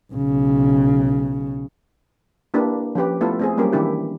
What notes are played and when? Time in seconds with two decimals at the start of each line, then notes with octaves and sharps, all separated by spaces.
0.13 B1 C#3
2.54 A#3 D4 E4 G4 B4
2.95 F3 C#4 G4 B4
3.21 A3 B3 E4 F4 A4
3.39 A3 C4 G#4
3.57 F#3 G3 A#3 C#4 G4 A#4
3.73 D#3 E3 D4 E4 G4